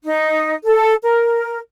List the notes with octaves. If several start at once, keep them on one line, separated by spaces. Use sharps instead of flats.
D#4
A4
A#4